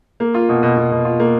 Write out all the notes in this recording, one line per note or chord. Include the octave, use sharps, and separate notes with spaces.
A#3
F4
B2
B2
B2
B2
F4
A#3